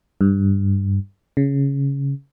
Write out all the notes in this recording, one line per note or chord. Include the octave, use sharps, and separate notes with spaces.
G2
C#3